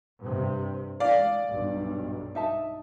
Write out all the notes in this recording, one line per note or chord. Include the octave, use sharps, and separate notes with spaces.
G2 C3
G#3 D5 F5
B1 G2
D#4 E5 A5